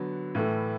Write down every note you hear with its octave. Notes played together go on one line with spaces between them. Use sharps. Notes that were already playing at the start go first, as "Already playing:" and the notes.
Already playing: D3 F#3 B3
A2 E3 A3 E4